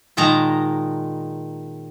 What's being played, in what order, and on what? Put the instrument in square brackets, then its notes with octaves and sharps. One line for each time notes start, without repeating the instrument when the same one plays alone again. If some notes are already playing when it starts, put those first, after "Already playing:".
[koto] A#2 D#3 G#3 A5 A#5